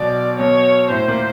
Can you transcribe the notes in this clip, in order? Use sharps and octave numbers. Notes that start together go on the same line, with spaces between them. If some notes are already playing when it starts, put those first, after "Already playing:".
Already playing: B1 B2 D5
B1 B2 C#5
A2 C5
A#2